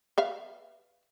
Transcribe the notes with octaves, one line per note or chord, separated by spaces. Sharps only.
B4 E5 F5